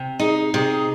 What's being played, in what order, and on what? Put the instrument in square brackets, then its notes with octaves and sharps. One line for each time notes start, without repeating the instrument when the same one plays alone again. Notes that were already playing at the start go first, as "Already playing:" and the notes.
Already playing: [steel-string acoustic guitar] C3
[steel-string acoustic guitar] D#4 [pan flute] G#4
[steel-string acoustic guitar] C3 [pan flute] G#4